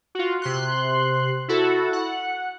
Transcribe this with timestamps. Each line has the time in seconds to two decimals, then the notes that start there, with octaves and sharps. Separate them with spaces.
0.15 F4 F#4
0.42 C3 C6 F#6
1.48 E4 F#4 A4
1.93 F#5